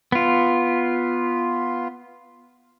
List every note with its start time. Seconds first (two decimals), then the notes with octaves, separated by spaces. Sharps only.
0.12 B3 F4